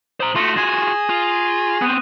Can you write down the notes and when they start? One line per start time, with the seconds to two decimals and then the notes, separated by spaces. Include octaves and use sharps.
0.20 C5 A#5 D#6 F#7 G7
0.36 A3 F4 F#4 C#6 A#6 E7
0.57 G#4
1.10 F4
1.82 B3 C4 D#6 F#6 D#7